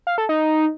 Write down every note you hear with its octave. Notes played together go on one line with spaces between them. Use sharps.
F5
A4
D#4